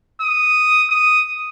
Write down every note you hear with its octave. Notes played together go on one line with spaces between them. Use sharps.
D#6
D#6